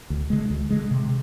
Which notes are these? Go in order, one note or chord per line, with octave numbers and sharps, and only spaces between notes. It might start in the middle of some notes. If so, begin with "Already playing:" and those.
D2
D3 G#3
D2
D3 G#3
C3